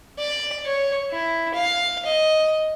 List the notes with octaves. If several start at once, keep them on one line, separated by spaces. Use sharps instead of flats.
D5
C#5
E4
F5
D#5